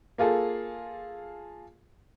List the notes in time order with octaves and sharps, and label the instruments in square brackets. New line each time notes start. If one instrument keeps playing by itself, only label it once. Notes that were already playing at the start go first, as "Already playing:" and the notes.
[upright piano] A#3 F4 G#4 A4